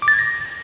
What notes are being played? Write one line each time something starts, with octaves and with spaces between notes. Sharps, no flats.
D6
A6
G#6
A#6